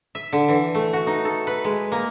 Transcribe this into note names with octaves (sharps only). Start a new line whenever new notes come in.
E5
D3
E3
A3
F#4
D#4
A4
B4
G#3
A#3